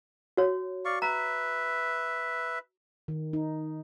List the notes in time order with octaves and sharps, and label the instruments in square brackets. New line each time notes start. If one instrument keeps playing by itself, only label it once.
[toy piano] F#4 C#5
[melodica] D5 F5 C#6
[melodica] B4 E5 [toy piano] A#5
[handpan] D#3
D#4